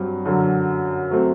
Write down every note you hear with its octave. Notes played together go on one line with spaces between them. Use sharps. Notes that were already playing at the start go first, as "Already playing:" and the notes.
Already playing: G2 F#3 C4
F#2 D3 F#3
F#3 A3 C4